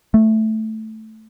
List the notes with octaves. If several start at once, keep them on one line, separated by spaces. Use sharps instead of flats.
A3